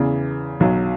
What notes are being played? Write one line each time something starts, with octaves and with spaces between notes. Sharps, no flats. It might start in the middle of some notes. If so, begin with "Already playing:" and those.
Already playing: E2 C#3 E3
B1 B2 F#3